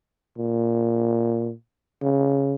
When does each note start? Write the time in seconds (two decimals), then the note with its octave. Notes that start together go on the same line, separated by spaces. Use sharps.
0.37 A#2
2.02 C#3